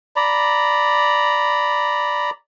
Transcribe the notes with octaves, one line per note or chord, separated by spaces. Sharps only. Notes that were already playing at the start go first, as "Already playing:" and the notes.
D5 A#5 B5